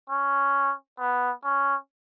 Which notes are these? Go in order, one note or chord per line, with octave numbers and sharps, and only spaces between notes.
C#4
B3
C#4